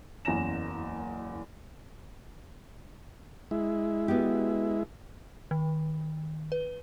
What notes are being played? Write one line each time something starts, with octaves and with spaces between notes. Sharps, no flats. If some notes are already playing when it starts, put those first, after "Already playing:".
F#1 E2 C#4 A#5 A#6 E7
G#3 E4
B3 F#4 G4
D#3
B4